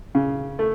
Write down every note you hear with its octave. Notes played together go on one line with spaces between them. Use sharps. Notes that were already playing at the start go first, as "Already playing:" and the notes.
C#3
A3